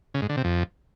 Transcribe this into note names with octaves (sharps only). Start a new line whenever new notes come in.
C#3
G#2
D3
C3
F2